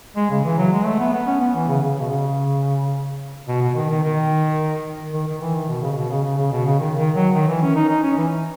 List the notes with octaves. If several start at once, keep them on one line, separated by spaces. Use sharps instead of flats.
G#3
C#3
E3
F#3
G#3
A3
B3
B3
C#4
B3
E3
C#3
C#3
B2
C#3
B2
B2
D#3
D#3
D#3
D#3
D#3
E3
D#3
B2
C#3
C#3
B2
C#3
C#3
C#3
B2
C#3
D#3
D#3
F#3
D#3
E3
C#4
D#4
D#4
C#4
E3